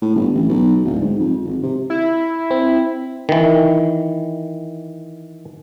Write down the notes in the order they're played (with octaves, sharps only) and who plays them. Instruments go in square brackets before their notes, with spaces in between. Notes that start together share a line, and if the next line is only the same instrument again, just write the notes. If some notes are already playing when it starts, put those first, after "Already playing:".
[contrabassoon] A2
G1
A1
B1
D1
G#2
F2
G#1
C3
[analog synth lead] E4
[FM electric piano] C4
[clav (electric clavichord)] D#3 E3